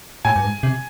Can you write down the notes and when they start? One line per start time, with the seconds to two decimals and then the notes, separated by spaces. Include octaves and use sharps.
0.25 A2 G#5
0.36 G2
0.44 G#2
0.63 C3